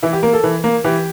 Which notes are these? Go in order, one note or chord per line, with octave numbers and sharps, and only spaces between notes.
E3 E4
G4
A#3 A#4
A4
E3
A#3
E3 G4